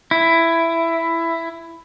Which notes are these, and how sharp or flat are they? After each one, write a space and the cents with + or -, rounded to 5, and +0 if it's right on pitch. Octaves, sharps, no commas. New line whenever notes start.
E4 +10